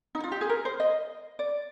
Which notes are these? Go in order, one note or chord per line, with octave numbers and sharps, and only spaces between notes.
D#4
F4
G4
G#4
A#4
C5
D#5
D5